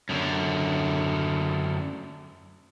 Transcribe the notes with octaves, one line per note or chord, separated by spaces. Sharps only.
F#2 D3